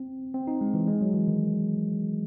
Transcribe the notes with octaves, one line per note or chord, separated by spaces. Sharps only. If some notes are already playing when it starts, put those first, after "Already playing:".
Already playing: C4
C4
D#4
G#3
E3
G#3
F#3
E3
D#3